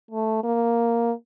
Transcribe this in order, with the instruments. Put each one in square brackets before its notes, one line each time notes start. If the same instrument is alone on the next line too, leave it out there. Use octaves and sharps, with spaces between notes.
[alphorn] A3
A#3